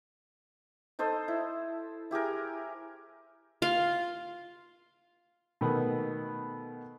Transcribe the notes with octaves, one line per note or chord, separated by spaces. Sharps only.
D#4 A4 C5 D#5
E4
E4 G4 G#4 A#4
F4 F5
B2 D#3 A3 B3